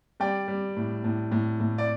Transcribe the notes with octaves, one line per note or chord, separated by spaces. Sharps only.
G3 D5 G5
G3
A2
A2
A2
A2
D5